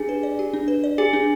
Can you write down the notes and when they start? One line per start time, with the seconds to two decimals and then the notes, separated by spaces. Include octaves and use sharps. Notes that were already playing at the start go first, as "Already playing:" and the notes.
Already playing: D4 G4 G#4
0.09 B4
0.23 D5
0.39 G4
0.54 D4
0.68 B4
0.84 D5
0.98 G4 G#4
1.13 D4